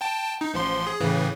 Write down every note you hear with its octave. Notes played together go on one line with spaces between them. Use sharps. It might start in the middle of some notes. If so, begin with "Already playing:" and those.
G5 A5
D#4
A1 F3 C6
G#4
A2 C#3 E3